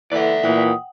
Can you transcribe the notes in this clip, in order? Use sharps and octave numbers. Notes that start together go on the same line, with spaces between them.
E3 A#3 A4 D5 E5 F#5
A#2 E3 F#5 G5 D#6